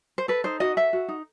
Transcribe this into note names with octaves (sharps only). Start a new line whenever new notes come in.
C5
A4 B4
D#4 C5
F#4 D#5
A4 E5
F#4
D#4